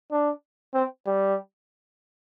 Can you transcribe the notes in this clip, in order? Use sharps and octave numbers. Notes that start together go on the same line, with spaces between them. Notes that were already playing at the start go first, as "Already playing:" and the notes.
D4
C4
G3